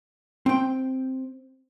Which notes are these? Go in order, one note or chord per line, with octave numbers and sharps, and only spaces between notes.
C4 G5